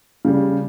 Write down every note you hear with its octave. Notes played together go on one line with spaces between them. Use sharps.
C#3 G3